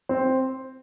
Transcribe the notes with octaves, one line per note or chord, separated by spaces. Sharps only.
C4